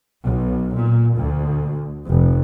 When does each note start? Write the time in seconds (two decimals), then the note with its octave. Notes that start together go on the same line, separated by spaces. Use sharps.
0.24 B1
0.76 A#2
1.16 D2
2.07 F1